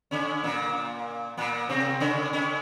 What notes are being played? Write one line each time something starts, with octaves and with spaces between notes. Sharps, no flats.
C#3 C#4
A#2 A#3
A#2 A#3
C3 C4
C#3 C#4
C#3 C#4